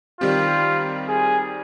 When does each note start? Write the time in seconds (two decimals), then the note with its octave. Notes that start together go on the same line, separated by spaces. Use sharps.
0.20 D#3 G3 C4 F4 G4
1.08 G#4